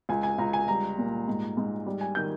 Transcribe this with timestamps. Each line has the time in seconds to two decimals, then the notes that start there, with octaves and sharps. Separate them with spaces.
0.09 C#2 G#5
0.23 G#5
0.38 C#2 A#5
0.53 G#5
0.68 G3 A#5
0.98 A#2
1.28 G#2
1.57 G#2
1.87 G3
2.01 G#5
2.15 D#3 G6